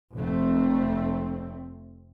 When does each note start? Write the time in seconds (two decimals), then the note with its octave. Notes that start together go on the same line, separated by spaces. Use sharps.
0.14 F1 A3 C4